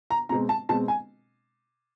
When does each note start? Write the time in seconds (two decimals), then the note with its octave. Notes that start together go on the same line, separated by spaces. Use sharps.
0.11 A#5
0.29 B2 G#3 C4 A#5
0.49 A5
0.69 B2 G#3 C4 A5
0.88 G#5